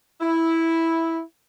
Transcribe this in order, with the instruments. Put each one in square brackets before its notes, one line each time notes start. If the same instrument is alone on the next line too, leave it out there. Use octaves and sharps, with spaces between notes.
[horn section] E4